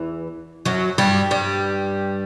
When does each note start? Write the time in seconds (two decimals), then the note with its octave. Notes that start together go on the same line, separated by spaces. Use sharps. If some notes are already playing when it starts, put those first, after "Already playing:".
Already playing: E2 E3
0.65 F#2 F#3
0.98 G2 G3
1.31 G2 G3